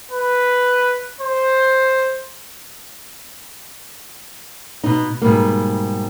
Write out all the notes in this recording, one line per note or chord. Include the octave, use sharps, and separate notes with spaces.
B4
C5
B2 D#4
G#2 B2 G3 A#3